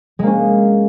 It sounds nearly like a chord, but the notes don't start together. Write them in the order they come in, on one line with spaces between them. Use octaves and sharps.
G#3 A#3 C#4